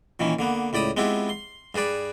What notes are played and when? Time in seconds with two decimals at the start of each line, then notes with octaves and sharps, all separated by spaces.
0.20 A#2 D#3 E3 C#4
0.39 D3 A#3 B3
0.73 C#2 A2 D5 B5 D#6
0.97 G#3 B3 C4 E4 F4 G4
1.29 C6
1.75 G2 G#4 B4 D5 B5